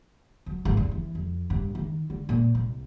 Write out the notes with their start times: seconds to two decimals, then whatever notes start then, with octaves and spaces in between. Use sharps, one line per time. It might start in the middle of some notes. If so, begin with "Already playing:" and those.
0.46 F#3
0.65 G#1
0.77 E2
0.91 E3
1.15 F2
1.50 G2
1.75 D#3
2.10 D3
2.29 A#2
2.55 C2